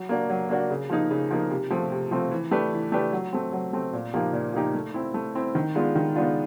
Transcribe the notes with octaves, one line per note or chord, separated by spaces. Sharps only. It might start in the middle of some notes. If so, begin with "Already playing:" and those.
Already playing: F#3
A#3 D4 F#4
F#3
A#3 D4 F#4
C#3
F3 A#3 D#4
C#3
F3 A#3 D#4
C3
F3 A3 C4 F4
C3
F3 A3 C4 F4
E3
A3 D4 G4 B4
E3
A3 D4 G4 B4
F#3
A3 C4
F#3
A3 C4
A#2
F3 A#3 D#4 G4
A#2
F3 A#3 D#4 G4
A3
C4 E4
A3
C4 E4
D#3
G#3 B3 D4 F4
D#3
G#3 B3 D4 F4